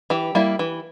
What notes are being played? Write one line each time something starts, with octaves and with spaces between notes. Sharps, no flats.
E3 G4
G3 A#3 E4
E3